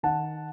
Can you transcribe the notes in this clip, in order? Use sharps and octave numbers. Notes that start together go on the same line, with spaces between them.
D#3 F#5 A5